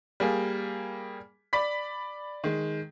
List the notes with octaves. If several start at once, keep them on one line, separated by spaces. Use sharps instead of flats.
G3 A#3 G#4
D5 B5 B6
D#3 G#3